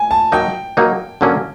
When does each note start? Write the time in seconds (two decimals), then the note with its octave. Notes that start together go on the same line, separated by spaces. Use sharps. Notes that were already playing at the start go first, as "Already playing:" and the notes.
Already playing: G#5
0.11 A5
0.32 F#3 A#3 D#4 G5
0.77 F#3 A#3 D#4
1.21 D3 F#3 A#3 C#4